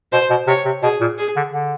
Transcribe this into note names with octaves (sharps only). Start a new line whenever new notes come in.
B2 C5
B2
C3 C#5
C3
B2 G#4
A#2
G#4
D3
D3